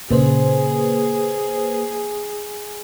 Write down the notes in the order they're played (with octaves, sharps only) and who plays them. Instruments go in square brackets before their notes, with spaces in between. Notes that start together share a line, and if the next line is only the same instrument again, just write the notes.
[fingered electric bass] A#2 C#3 [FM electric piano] A#3 B4 C5 [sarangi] G#4